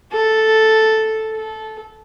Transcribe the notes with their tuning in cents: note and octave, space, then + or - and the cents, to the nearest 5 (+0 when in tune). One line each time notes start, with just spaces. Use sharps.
A4 +0
A4 -15